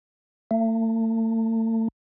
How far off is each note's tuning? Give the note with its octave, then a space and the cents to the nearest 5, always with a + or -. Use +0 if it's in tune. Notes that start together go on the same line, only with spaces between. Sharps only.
A3 +40